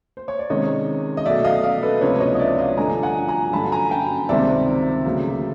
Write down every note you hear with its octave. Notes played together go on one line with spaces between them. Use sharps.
C5
C#5
D5
C3 D#3 G#3 C#4 C#5 D#5
D#5
B2 F#3 A3 D5 E5
D#5 F5
D#5 F5
A4 B4
C#2 C3 F3 A#3 D4 B4 C#5
C#5 D#5
D#5
D5 E5
D#5 F5
G2 D3 F3 A3 D4 G#5 A#5
F#5 G#5
G#5 A#5
G2 D3 F#3 A5 B5
A5
G#5 A#5
G5 A5
C#2 C3 D#3 G3 C4 D5 E5
D2 C#3 F#3 A#3